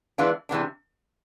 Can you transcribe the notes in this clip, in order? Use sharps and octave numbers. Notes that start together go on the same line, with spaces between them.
E3 G#3 B3 D4 F4
C3 E3 G#3 B3 D4